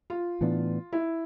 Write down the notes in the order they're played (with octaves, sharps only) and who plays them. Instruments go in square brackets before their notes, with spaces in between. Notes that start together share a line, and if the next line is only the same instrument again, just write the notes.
[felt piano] F4
[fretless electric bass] A2 E3 B3 D4
[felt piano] E4